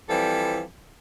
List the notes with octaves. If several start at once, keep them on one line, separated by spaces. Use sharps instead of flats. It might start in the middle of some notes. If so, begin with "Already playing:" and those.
E3 F3 G3 C4 A4